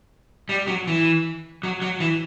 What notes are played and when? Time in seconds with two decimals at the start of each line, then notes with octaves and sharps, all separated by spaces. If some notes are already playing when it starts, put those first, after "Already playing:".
0.49 G3
0.68 F#3
0.87 E3
1.63 F#3
1.82 F#3
2.00 E3